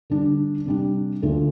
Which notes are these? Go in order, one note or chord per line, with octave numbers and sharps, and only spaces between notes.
D3 G3 D4
C3 G3 D4
D2 D3 A3 D4 F4